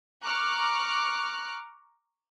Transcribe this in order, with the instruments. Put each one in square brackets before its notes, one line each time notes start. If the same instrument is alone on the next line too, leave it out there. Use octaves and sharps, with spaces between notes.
[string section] A#5 C#6 D6 F6 F#6